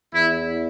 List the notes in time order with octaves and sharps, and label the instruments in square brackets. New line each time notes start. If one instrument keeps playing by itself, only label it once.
[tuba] E2 [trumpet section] E4